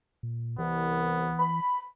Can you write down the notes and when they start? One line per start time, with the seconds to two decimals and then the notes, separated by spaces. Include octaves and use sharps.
0.23 A#2
0.59 C2 E3 B3
1.39 B5